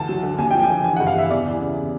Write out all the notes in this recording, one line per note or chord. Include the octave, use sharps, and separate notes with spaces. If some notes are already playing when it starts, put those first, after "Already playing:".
Already playing: D2 E3 A5
F#3
D3
D#2 G#5
F3 G5
G#5
D3
E3 G#5
F#5
G2
F5
E3 E5
E2 D5
E3
C#3